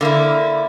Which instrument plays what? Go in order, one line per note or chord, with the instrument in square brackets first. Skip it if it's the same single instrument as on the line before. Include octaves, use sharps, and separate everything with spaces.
[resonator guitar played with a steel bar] D3 A#3 E4